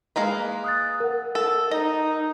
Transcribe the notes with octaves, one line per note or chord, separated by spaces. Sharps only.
G#3 A#3 B4
D#6 F#6 A6
A#4 F#5
A4
D#4 D#5